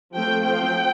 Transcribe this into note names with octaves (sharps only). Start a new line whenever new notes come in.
F3 A3 C4 G5
F3 C4 G5